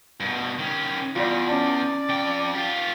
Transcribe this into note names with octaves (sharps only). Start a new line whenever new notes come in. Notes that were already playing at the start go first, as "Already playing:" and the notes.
G2 B2
D#3 C#4
E2 G3 F4 D5
C#4 D5 A5
F2 G5
F4 G4